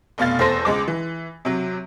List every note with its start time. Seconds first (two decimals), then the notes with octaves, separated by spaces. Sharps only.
0.18 F1 B2 F5 A6
0.39 E2 A4 C5 A#6
0.65 C#2 G#3 D6
0.88 E3
1.45 C3 F#3